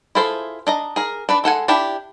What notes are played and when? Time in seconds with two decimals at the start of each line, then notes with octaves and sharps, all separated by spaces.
0.15 E4 F4 G#4 A4 C5
0.67 D4 D#5 A#5
0.96 G#4 A#4
1.29 D4 B4 D5
1.44 G#3 A4 F#5 G#5
1.68 D4 E4 G4 A5